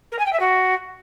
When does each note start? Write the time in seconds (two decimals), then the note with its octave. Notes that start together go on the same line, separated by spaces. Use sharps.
0.12 A#4
0.19 G#5
0.26 G5
0.33 E5
0.40 F#4